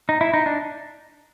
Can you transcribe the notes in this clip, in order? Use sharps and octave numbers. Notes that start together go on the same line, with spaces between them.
D#4
E4
D#4
D4